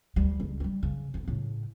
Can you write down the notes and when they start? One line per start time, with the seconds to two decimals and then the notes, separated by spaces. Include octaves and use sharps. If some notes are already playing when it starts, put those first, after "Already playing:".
0.16 D2 G3
0.40 C#2 G2
0.60 F#3 G3
0.83 C#3
1.14 D2 E3
1.28 A2 C#3